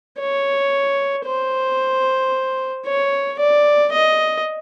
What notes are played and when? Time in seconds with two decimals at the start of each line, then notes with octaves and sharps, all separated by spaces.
0.20 C#5
1.26 C5
2.86 C#5
3.39 D5
3.92 D#5